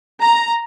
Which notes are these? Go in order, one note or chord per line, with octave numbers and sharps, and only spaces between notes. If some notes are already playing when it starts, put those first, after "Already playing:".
A#5